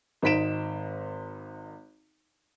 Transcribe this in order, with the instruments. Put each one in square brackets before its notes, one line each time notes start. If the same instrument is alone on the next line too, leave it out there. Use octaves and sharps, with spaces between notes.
[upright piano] G#1 D#4 C5 B6 D7 E7